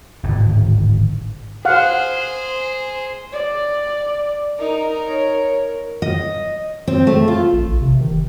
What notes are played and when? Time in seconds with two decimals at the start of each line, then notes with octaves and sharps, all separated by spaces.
0.23 D1 G#1 A2
1.65 G#4 C5 F5 F#5
3.32 D5
4.59 D#4 A#4
5.08 C#5
6.02 D#5
6.88 C4
7.07 A3
7.28 F4
7.53 A1
7.67 A#1
7.81 C3
8.01 D#3
8.12 F1